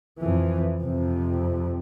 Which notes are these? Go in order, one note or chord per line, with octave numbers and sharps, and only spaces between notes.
F2 E3
F2 C3